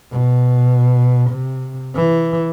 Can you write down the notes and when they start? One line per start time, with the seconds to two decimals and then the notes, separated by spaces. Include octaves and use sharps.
0.11 B2
1.30 C3
1.95 E3